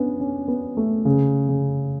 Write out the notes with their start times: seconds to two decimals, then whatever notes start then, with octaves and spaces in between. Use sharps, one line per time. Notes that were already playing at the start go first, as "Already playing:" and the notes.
Already playing: B3 C#4 D4
0.20 C#4
0.48 B3
0.77 A3
1.05 C#3
1.49 C#3